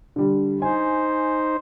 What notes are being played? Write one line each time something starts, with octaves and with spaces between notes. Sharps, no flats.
D3 G3
D#4 C5 G#5